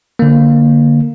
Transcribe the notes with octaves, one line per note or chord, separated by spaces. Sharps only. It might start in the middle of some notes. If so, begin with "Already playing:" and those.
D3 A#3